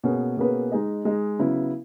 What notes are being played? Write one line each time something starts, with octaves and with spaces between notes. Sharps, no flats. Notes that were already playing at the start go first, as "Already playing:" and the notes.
B2 A#3 C#4 G#4 B4
B2 A#3 C#4 G#4 B4
G#3 D#4 G#4 D#5
G#3 D#4 G#4 D#5
C#3 F#3 B3 E4